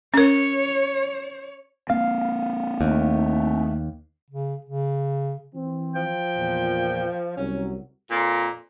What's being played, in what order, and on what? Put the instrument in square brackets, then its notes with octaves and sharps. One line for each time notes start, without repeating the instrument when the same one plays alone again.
[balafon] C#4 A#4 [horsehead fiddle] C#5
[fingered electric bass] A#3 C4 [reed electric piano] F5
[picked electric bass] D#2 [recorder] A3
[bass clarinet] C#3
C#3
[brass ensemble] E3 C4
[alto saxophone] F3 [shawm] G5
[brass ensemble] E2 A#2
[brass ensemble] C2 F#3 [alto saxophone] C#4
[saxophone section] F2 A#2